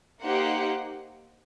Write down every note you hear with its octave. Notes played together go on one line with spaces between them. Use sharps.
A#3 D#4 G4 C5 F#5